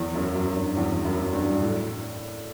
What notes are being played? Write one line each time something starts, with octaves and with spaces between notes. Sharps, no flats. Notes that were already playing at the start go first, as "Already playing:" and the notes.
Already playing: E2
F#2
F#2
G2
E2
F#2
G2
A2